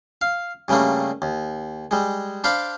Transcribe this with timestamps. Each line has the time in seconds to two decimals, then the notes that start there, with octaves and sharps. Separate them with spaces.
0.21 F5
0.68 G2 C#3 G3 A3 A#3
1.22 D#2
1.91 G3 G#3
2.44 D4 C5 F5 B5 D6